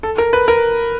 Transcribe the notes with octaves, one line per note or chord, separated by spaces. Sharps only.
A4
A#4
B4
A#4